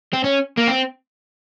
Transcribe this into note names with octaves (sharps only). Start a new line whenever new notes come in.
C4
C#4
A#3
C4